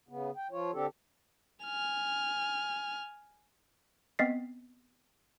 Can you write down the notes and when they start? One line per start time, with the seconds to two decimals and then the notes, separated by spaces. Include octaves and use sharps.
0.09 C#3 B3
0.36 G5
0.51 F3 F4 C#5
0.73 D3 C4 D4 G4 A4
1.64 G#5 F6
4.19 B3 C4 D#5 A6 B6 C7